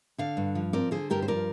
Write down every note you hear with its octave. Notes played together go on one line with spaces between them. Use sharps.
D3 D5 F5
G2
F3
C4 A#4 D5
D3 G#4 C5
G2 G4 A#4
C5
F3 A#4 D5